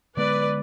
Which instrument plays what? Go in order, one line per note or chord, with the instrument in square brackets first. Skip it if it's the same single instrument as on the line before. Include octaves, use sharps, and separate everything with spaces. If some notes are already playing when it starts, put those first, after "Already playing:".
[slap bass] D3 G#3 B3 [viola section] B4 D5